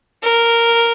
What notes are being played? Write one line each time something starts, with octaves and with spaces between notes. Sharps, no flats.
A#4